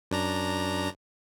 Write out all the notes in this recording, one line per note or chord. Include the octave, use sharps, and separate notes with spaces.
F#2 D4 A#5